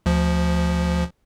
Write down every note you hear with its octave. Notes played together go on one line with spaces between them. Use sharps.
D2 F3